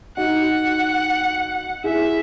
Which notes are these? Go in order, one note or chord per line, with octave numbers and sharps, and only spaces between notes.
D#4 F#4 F#5
E4 G#4 E5